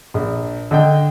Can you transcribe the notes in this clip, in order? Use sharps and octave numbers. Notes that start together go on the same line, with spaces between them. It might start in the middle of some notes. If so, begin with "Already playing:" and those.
A#1
D3 D#5 G5